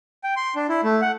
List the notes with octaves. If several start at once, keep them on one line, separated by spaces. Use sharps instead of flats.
G5
C6
D4
E4
A3
F#5